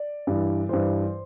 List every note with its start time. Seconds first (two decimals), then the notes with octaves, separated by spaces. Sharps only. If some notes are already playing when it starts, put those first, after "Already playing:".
Already playing: D5
0.27 G2 E3
0.69 G2 E3 C5